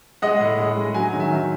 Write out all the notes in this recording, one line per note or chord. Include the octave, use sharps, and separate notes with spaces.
G#3 D#5 F#5
A2
G#3
G#3
F#3 G#5
D#3
E5 G#5
D#3